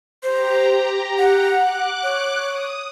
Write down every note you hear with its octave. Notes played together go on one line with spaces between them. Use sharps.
G4 C5 A#5
F#5
D6 F#6
C#5
D#6